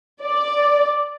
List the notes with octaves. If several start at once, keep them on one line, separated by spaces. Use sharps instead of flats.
D5